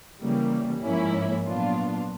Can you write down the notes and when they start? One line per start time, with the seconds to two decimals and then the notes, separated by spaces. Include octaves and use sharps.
0.21 C#3 E3 G3 A#3
0.83 G#2 F3 A#3 C#4 E4
1.46 A#2 F#3 B3 D4 F4